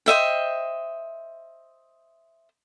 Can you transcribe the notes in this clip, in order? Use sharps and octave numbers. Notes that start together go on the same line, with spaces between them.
C5 D#5 E5 G5